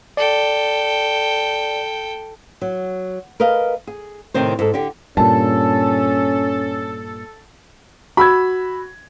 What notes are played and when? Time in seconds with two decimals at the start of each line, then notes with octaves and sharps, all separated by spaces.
0.17 A4 D5 G5
2.62 F#3
3.40 A#4 B4 D#5 F5
3.87 G#4
4.34 A2 C3 D#3 C4 C5
4.59 G#2 A4
4.74 D3 G4 D5
5.17 G2 A#2 C#4 A4 A5
8.17 F#4 B5 E6 G#6